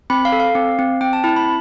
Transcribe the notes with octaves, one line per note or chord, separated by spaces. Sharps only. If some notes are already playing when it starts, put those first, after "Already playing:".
C4 B5
F5
A4
F5
C4
C4
C4 G5
A5
E4 A5
B5